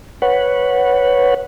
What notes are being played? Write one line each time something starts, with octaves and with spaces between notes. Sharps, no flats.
B4 C#5 F#5